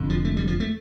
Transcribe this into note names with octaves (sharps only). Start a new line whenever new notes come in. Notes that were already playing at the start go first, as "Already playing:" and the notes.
Already playing: F1 F2 D3
F3
A3
G3
F3
A3